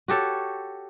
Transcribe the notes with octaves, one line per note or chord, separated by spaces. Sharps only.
F#4 G4 A4 C#5